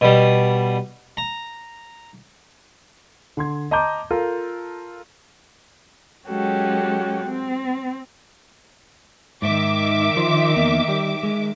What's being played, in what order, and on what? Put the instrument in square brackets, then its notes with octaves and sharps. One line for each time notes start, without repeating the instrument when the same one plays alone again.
[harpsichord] B2 G3
A#5
[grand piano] D3 C6 G#6
D#5 A5 A#5 C6 D6 G6
F4 A4 A#4 F5
[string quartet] F#3 G#3 C#4 F#4 G4 A4
C4
[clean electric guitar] G#2 [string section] D#3 E5 D6
[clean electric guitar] F3 C5
E2 A#3
G3
G#3